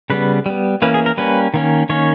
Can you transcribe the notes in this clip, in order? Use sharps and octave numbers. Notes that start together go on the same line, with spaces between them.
C#3 G3 B3 B4
G3 B3
E3 A#3 C#4 B4
G#4
A#4
G3 A#3 C#4 B4
D#3 A#3 C#4
D#3 A#3 C#4 C#5